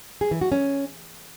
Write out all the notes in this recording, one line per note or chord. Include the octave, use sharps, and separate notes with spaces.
G#4
E3
F#4
C#4